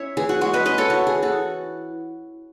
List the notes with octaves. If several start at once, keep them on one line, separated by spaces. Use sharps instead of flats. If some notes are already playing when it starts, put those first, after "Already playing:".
Already playing: C#4 E4 C#5 E5
E3 G#4
F#4
G#3 F#4
B4 D#5
C#4 B4 D#5
A4 C#5
E4 F#4
G#4
E3
F#4 A4